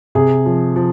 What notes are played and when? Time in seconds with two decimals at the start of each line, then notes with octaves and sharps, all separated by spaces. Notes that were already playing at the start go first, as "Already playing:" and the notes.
0.15 C3 G#4
0.46 F3
0.76 F3